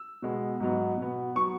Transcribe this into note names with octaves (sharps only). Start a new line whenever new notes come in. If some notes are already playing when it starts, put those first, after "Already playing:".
Already playing: E6
B2 G#3 B3
G#2 F#3 B3
B2 B3
F#3 B3 C#6